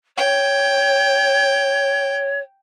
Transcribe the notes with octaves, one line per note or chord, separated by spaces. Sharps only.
C#5 G5